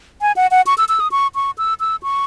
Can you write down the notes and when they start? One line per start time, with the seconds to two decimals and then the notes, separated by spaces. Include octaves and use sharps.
0.22 G#5
0.36 F#5
0.51 F#5
0.67 C#6
0.78 E6
0.89 E6
1.00 D#6
1.11 C#6
1.35 C#6
1.58 E6
1.80 E6
2.03 C#6